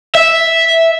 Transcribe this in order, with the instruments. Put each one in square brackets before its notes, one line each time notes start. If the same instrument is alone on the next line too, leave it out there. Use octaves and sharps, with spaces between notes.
[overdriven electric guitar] E5